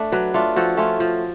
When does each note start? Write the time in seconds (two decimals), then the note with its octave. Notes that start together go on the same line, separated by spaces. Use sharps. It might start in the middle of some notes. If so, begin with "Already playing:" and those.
Already playing: A3 D4
0.12 F#3 B4 D5
0.34 A3 D4 F4
0.56 F3 F#4 A4
0.77 A3 C#4 F4
1.00 F3